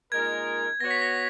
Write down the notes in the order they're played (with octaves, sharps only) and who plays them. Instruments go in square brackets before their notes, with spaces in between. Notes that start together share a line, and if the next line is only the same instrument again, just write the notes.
[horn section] A#2 G#3 D#4 A#4 [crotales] G#6
[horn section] B3 F#4 C#5 [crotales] A#6
[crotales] B6
A#6